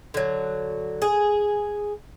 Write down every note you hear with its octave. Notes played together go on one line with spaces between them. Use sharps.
D3 F#3
G#4